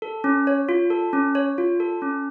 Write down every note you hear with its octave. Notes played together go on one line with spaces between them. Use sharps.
A4
C#4
C#5
F4
A4
C#4
C#5
F4
A4
C#4